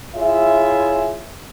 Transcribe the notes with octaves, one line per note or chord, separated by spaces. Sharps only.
E4 F4 G#4 C#5 E5